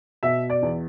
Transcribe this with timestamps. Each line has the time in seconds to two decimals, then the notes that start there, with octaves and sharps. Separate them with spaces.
0.23 B2 E5
0.50 D5
0.62 E2